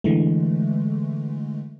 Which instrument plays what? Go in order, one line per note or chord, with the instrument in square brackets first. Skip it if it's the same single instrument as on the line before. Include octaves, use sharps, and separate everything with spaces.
[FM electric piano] D3 E3 G#3 A3